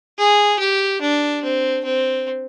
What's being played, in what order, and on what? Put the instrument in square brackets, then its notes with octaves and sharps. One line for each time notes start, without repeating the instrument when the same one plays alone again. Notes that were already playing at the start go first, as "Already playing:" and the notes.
[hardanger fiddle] G#4
G4
D4
C4
C4